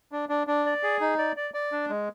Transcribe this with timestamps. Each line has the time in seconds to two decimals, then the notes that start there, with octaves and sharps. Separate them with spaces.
0.12 D4
0.29 D4
0.47 D4
0.66 D5
0.83 G#4
1.01 D#4
1.19 D5
1.37 D5
1.54 D5
1.72 D4
1.90 G#3